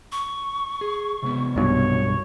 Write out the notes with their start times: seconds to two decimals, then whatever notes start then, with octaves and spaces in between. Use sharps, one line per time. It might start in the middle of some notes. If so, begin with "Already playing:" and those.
0.12 C#6
0.81 G#4
1.23 C3 G#3 B3
1.56 B1 G2 B2 C#5